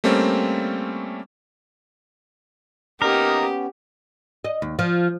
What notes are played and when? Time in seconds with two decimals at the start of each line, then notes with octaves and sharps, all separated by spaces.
0.04 G3 A3 A#3 C4 C#4
3.02 A#3 B3 C#4 D#4 G4 A#4 D#6
4.45 D#5
4.62 D#2
4.79 F3